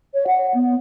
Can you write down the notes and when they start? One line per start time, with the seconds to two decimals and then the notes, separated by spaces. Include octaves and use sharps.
0.14 C#5
0.27 F#5
0.54 B3